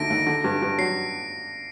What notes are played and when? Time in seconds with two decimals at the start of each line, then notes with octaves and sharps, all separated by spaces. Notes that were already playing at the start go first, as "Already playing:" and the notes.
Already playing: D#2 D3 A3 A#6 D7
0.10 D#2
0.27 D3
0.44 G2
0.62 G2
0.78 F#3 C7